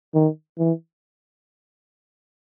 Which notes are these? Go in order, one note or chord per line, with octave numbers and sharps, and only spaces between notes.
D#3
E3